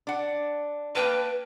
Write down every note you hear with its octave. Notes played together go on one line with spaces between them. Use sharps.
D4 F#5
A#3 B4 G5 A5